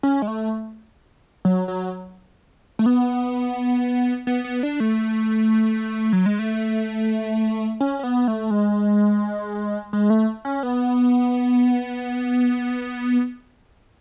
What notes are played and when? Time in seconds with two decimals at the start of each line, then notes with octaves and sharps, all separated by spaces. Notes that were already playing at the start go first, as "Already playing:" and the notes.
0.03 C#4
0.22 G#3
0.28 A3
1.45 F#3
1.68 F#3
2.79 A3
2.86 B3
4.27 B3
4.44 B3
4.63 D4
4.80 A3
6.13 F#3
6.26 G#3
6.39 A3
7.80 C#4
7.99 C#4
8.03 B3
8.28 A3
8.51 G#3
9.93 G#3
10.10 A3
10.45 C#4
10.63 B3